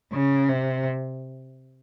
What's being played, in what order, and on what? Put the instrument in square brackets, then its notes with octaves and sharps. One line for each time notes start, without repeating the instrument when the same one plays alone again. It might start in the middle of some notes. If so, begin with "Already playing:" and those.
[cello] C#3
C3